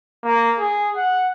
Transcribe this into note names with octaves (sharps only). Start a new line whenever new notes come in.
A#3
G#4
F#5